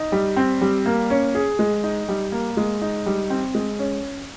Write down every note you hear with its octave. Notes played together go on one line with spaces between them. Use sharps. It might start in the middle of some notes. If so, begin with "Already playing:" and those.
Already playing: D#4
G3
C4
G3
A#3
C#4
G#4
G#3
D#4
G3
A#3
G#3
D#4
G3
C4
G#3
C#4